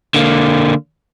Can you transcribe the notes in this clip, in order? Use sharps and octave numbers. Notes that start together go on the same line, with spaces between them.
D3 A#3